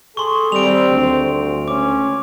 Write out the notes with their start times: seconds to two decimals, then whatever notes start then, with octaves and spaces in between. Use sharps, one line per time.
0.17 G#4 A4 C6 C#6
0.52 D#3 G3 C4 D7 F7
0.90 D2
1.68 C#2 C#4 D6